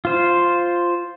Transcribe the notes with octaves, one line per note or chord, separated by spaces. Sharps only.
F4 C5